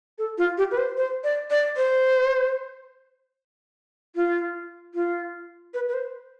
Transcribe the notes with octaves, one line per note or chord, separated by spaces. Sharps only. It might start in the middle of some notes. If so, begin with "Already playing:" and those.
A4
F4
G4
B4
C5
C5
D5
D5
C5
F4
F4
B4
B4
C5